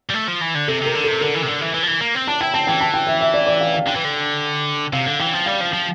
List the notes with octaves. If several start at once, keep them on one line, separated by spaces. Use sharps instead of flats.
G3
A3
F3
E3
D3
C3 A4
C3 A#4
D3
C3 A4
D3 A#4
E3
C3
D3
E3
E3
F3
E3
A#3
C4
D4 A5
E4 G5
C4 A5
E3 G5
A5
G5
E5
E5
D5
D5
F5
F5
D3 G5
E3
D3
C3 F5
D3
E3 G5
F3
G3 F5
F3
F3